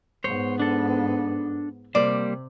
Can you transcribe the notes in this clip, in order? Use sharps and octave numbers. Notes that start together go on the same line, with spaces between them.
G#2 B3 C5 C#5
D4 A4
C3 G3 A#3 C5 D5